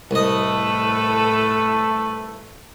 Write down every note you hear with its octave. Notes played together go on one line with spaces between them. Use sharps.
C2 A2 A3 A4 B4 D#5